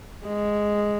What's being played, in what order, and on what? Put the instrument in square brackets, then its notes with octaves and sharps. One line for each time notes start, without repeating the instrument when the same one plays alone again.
[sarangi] G#3